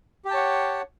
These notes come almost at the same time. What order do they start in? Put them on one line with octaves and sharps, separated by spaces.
G4 G5 A5 C#5 F#5